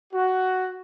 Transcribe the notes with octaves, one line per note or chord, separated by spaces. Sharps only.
F#4